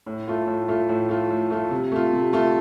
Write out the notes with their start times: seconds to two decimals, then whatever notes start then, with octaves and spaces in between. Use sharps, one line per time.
0.06 A2
0.28 A3 F4
0.47 A2
0.68 A3 F4
0.89 A2
1.09 A3 F4
1.30 A2
1.50 A3 F4
1.71 C3
1.92 A3 F4
2.13 C3
2.33 A3 F4